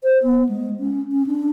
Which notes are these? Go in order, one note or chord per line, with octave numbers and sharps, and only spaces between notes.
C5
B3
G#3
C#4
C#4
D4